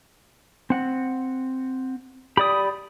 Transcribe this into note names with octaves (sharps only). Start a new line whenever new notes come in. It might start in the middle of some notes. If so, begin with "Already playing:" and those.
C4 F#5
G4 D5 B5 D#6